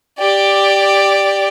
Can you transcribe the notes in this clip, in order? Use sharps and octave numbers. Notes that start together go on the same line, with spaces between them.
G4 D5